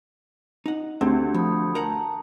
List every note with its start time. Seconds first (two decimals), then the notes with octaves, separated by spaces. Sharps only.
0.66 D#4 F#5
1.01 D2 C4 G4
1.34 F3 B5 D#6
1.75 A#4 F#5 A5 A#5